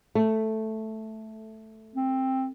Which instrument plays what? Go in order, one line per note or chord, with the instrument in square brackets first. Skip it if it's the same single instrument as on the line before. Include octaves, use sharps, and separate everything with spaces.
[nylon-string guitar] A3
[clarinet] C4